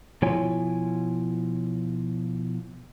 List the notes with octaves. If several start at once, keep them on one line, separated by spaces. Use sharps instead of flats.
B2 F3 E4 F4 C#5 G#5